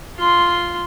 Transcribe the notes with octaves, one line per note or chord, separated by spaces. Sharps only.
F4 C6